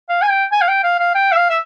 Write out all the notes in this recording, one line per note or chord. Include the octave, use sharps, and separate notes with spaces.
F5
G#5
G5
G#5
F5
G5
F5
F5
G5
E5
F5
E5